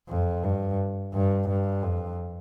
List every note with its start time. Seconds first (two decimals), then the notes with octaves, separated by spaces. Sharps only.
0.09 F2
0.44 G2
1.14 G2
1.48 G2
1.83 F2